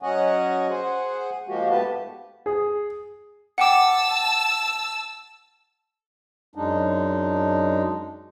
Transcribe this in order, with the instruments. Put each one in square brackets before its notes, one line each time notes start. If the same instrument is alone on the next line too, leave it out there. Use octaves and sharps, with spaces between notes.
[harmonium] F#3 C#4 C#5 D#5 F#5 G#5
G#4 C5 F#5 G#5
F3 G#3 A#3 F#4 G4
G#2 A3 B3 G4 B4 A5
[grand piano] G#4
[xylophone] F#5 G5 D6 [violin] A5 E6
[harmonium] F#2 G#3 D4 D#4